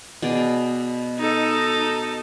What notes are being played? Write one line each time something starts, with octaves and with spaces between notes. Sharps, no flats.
B2 G#4 D5
D#4 A4